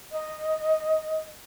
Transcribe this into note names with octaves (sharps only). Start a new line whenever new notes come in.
D#5